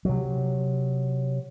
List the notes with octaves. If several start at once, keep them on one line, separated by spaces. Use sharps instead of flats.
C3 F#3